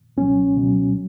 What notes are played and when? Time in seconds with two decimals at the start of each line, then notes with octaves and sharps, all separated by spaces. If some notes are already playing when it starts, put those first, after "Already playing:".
0.17 C#2 B2 F#3 C#4
0.55 C#2 B2 F#3
0.93 F#3